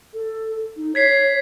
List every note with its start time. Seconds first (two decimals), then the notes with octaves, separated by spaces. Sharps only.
0.14 A4
0.76 D#4
0.95 C#5 G#6 B6 C7